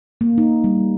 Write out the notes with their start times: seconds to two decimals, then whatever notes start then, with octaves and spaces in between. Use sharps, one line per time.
0.21 A#3
0.38 D#4
0.64 G3